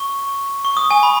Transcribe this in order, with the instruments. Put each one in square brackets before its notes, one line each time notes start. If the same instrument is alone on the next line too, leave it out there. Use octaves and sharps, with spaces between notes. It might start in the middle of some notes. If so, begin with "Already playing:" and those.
Already playing: [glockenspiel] C#6
C#6
D#6
G#5
B5